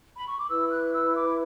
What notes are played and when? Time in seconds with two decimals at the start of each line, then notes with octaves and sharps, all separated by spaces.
0.16 B5
0.28 C#6
0.39 D6
0.49 E4 B4 E6
0.68 E6
0.72 F#6
0.93 E6
1.15 D6